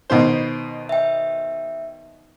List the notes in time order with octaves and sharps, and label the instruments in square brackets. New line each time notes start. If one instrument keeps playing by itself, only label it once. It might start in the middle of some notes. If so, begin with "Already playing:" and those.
[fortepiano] B2 D#3 C5
[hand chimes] E5 G5